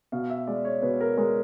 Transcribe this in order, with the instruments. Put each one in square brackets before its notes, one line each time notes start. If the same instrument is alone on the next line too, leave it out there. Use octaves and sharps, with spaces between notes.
[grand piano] B2 F5
E5
G#3 D5
C#5
B2 B4
A#4
G#3 A#4